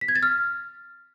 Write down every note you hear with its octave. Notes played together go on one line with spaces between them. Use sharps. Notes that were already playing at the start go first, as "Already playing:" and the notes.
B6
G#6
A6
F6